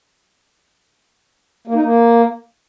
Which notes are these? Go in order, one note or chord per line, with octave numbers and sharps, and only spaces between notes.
A#3
D#4
A#3